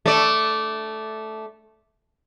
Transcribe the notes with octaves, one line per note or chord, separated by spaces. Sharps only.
A3 D5